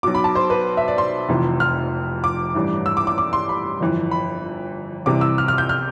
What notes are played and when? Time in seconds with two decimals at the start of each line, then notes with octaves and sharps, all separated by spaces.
0.03 B1 B2 D6
0.15 B5
0.24 A5
0.35 C5
0.50 B4
0.77 E5
0.88 D5
0.98 C6
1.29 F1 F2 C3 E3
1.60 F6
2.24 D6
2.55 A1 G2 E3
2.86 E6
2.97 D6
3.07 D6
3.18 D6
3.33 C6
3.49 B5
3.80 G1 F2 E3
4.11 B5
5.06 C2 C3 E3 D6
5.21 E6
5.38 F6
5.48 F6
5.58 G6
5.69 F6